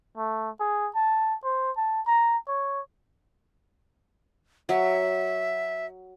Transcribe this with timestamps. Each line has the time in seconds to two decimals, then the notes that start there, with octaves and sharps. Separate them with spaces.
0.17 A3
0.60 G#4
0.95 A5
1.44 C5
1.77 A5
2.07 A#5
2.48 C#5
4.69 F#3 E5